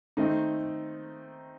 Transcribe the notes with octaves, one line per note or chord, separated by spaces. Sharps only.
D#3 A3 C4 D#4